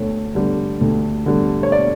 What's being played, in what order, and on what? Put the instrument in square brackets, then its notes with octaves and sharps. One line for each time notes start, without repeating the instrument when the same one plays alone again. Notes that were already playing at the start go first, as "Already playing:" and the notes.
Already playing: [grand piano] D2 D3 C#5
D3 G3
D2
D3 G3
C#5
D5